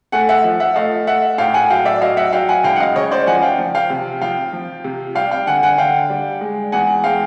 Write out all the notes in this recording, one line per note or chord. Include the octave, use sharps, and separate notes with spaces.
A3 F#5 G#5
E5 F#5
F3
E5 F#5
A3 D#5 F5
A3 E5 F#5
A2 F5 G5
F#5 G#5
F#3 F5 G5
D5 E5
F#3 D#5 F5
E5 F#5
F#3 F5 G5
F#5 G#5
C#2 F5 G5
F#5
D#5 F5
C#3 C#5 D#5
C5 D5
F3 F#5 G#5
F5 G5
F3
F5 G5
C3
F3 F5 G5
F3
C3
G3 F5 G5
F5 G5
D3 F#5 G#5
F#5 G#5
D3 F5 G5
G3
G#3
E2 F#5 G#5
G#3 F5 G5